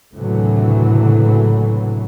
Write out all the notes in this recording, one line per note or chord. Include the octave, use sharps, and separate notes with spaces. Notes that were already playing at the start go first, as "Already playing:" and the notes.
F#1 D2 A2 C3 E3 F#3